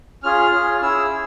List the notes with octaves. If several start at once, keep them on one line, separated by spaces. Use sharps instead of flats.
C#4 F4 G#4 F6
C#4 F4 G#4
C#4 E4 G#4 E6